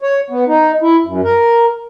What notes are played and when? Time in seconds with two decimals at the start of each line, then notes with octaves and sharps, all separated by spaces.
0.02 C#5
0.30 B3
0.48 D#4
0.82 E4
1.06 F#2
1.24 A#4